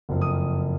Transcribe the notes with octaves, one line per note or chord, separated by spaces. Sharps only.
F#1 F2 F3
D#6